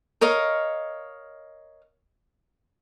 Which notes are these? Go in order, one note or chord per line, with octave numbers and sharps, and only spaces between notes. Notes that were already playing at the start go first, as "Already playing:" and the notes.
A#4 C#5 D#5 F5